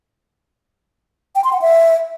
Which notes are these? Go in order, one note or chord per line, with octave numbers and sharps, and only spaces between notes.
G5
C6
F#5
E5